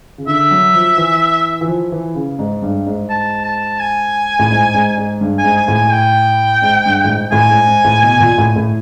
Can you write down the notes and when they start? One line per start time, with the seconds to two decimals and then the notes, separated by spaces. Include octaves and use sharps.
0.18 C#3
0.27 D3 E5
0.51 F#3
0.74 F3
0.97 E3
1.61 E3
1.68 F3
1.92 E3
2.15 C#3
2.39 G#2
2.62 G2
2.86 G#2
3.10 A5
3.45 A5
3.80 G#5
4.39 A2
4.51 G#2
4.74 G#2
4.97 G#2
5.21 G2
5.38 G#5
5.44 G#2
5.56 G#5
5.68 A2
5.74 G#5
5.92 G5
6.62 G#2
6.86 G2
7.04 A2
7.09 G#2
7.32 A2 G#5
7.50 G#2
7.67 G#2
7.84 A2
8.02 B2
8.20 A#2
8.38 A2
8.56 A2